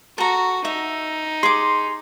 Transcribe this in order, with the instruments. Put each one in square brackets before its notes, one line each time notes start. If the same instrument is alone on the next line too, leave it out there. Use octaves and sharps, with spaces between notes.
[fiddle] F#4 [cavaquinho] A4 A#5
[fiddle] D#4 [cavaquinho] E5
[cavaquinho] G#4 D6 [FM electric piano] C6